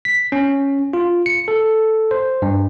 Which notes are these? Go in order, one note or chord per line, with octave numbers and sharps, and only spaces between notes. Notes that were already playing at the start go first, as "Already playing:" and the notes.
B6
C#4
F4
C#7
A4
C5
G2